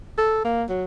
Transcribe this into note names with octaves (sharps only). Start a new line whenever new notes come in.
A4
A#3
F#3